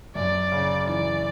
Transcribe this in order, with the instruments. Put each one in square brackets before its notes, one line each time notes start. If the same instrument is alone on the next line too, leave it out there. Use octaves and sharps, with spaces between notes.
[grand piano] F#2 [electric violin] D5
[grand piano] C#3
[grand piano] E3 [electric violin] D5